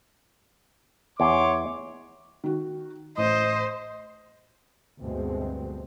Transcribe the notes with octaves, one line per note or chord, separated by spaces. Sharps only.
E2 C#5 C6 D6
D#3 F#4
A1 C5 D#5
D2 G2 B2 G#3 C4